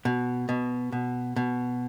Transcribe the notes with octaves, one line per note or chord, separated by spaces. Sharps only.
B2
B2
B2
B2